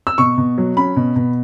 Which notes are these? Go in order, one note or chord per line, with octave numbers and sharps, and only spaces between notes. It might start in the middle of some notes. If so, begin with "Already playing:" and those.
E6
B2 C#6
B2
F#3
C#4 B5
B2
B2